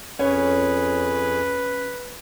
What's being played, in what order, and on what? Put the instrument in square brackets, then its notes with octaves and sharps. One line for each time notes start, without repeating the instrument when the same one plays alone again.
[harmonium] F2 G#4 [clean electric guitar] C#4 [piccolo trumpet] B4 [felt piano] C#5